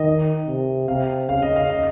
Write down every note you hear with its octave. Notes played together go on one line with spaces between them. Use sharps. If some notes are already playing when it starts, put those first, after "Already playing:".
Already playing: D#3 D#5
C3
C3 F5
C#3 F5
D#5
F5
D#5